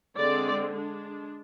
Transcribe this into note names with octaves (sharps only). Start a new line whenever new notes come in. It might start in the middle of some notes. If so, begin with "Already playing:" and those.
D3 G#3 C4 D5
G#3 D4